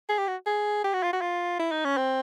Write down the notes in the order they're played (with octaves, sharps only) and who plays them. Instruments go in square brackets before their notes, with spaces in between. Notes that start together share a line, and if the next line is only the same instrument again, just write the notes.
[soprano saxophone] G#4
G4
F#4
G#4
G4
F#4
F4
F#4
F4
E4
D#4
C#4
C4